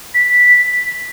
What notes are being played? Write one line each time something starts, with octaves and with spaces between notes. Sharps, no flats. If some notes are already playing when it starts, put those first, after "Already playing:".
B6